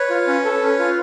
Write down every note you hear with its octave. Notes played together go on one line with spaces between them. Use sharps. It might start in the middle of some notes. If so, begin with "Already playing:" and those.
Already playing: B4 C#5
F4
C#4
A4
C#4
F4